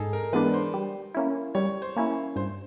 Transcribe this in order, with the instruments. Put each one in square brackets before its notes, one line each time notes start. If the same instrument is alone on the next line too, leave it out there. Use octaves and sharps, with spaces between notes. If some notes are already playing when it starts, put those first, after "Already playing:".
Already playing: [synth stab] G#2 [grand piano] D#4 G#4 A4
[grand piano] A#4
[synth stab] E3 G#3 B3 D4 [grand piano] B4
[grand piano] C5
[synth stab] G3
A#3 C#4 E4
[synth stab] G3 [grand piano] C#5
[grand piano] C5
[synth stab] A#3 C#4 E4
[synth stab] G2 [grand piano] C5